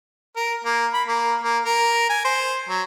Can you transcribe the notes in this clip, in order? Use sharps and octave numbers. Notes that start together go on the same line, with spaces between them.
A#4
A#3
B5
A#3
A#3
A#4
G#5
C5
F#3